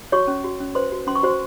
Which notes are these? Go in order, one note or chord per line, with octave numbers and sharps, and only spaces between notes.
F#4 C#5 C#6
C#4
F#4
C#4
B4 C5 C6
F#4
C#4 C6
C#6
F#4 C5 C6